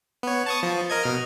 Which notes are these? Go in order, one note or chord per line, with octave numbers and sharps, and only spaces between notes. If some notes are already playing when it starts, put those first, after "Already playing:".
B3 C#5
A5 C#6 D#6
F3
A#4 D#5 G#6
B2 F6